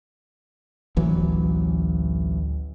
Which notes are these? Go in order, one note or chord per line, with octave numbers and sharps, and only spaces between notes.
A1 D2 E3 F#3